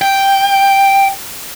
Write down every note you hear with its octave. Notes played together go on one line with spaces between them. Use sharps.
G5